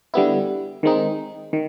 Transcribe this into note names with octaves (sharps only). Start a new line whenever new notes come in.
D3 G3 B3 E4
D#3 G#3 C4 D#4
D#3